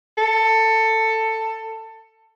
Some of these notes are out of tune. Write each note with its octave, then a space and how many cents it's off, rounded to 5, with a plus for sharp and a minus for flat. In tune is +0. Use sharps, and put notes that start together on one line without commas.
A4 +15